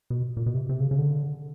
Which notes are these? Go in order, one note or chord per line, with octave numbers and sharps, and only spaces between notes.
B2
A#2
B2
C3
C3
C#3
C#3
D3